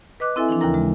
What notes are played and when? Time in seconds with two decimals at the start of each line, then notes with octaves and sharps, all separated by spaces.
0.20 B4 D#5 D6 F#6
0.36 C4 E4 A4 E5 G#5
0.49 E3 F3 D4
0.60 D#2 C#3 E3 E4 A#4 A#5
0.74 C#3 G#3